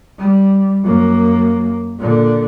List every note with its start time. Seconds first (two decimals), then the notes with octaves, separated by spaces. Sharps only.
0.18 G3
0.84 F#2 A#3
1.99 A#2 D3